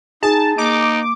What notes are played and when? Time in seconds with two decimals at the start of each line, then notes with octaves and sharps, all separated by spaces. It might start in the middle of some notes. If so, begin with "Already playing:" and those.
0.23 D#4 G#4 A5
0.58 A#3 D#4 D6